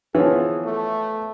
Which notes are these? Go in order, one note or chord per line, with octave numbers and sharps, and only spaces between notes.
E3 F3 B3 G#4 C#5
A3